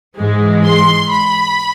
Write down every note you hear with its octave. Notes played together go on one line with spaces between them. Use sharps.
G#2 E3 G#3
C6
B5